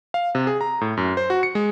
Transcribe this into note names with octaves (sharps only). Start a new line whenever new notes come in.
F5
C3
G#4
A#5
A2
F#2
C5
F#4
C#7
G#3